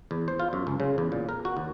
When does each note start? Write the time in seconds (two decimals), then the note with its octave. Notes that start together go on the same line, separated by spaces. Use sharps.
0.11 E2
0.28 C5
0.40 F4
0.53 F#2
0.67 C#2
0.80 C#3
0.98 E2
1.12 A#2
1.29 A#4
1.45 F#4
1.57 D#2